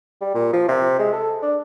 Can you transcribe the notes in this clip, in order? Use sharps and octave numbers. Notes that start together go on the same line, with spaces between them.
G3
A#2
F3
C3
G#3
A4
D4